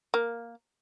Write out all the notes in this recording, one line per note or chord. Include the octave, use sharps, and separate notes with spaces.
A#3